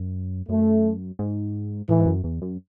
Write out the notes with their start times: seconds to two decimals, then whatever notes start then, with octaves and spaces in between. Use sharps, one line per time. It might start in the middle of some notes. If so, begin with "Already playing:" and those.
Already playing: F#2
0.49 F#2 A3
1.19 G#2
1.89 A2 E3
2.00 G#2
2.06 F#2
2.24 E2
2.42 F#2